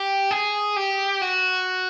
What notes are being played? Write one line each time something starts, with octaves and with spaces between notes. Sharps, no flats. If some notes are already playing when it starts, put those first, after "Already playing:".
Already playing: G4
G#4
G4
F#4